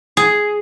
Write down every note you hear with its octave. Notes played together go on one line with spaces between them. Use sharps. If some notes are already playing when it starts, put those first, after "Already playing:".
G#4